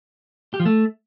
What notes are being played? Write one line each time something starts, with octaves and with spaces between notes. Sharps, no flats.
G4
F3
A3